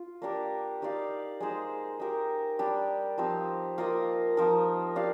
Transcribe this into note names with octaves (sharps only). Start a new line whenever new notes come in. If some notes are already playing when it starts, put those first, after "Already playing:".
Already playing: F4
A#3 D4 G4 A#4
D#4 G4 D5 F5
G#3 D#4 G#4 C5
D#4 G4 A#4
G3 D4 G4
F3 C4 D#4 G4
A#3 F4 A#4 D#5
F3 C4 D#4 A#4
D4 G4 D5 F5